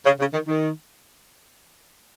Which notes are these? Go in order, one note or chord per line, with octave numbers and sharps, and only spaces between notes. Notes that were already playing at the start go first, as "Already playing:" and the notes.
C#3
C#3
D#3
D#3